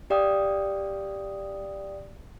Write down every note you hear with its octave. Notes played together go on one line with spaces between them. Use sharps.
G4 D5 F5 G5 D#6